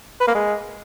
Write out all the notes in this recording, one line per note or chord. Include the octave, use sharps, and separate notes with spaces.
B4
A#3
G#3